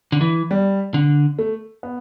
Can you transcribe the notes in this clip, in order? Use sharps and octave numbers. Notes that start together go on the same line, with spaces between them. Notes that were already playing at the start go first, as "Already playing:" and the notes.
D3
E3
G3
D3
A3
B3